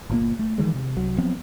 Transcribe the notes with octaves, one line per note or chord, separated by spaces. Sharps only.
G1 A#2 A#3
A3
D#3 E3 F#3 G#3
C3
C2 F#3
F3 F#3 B3 C4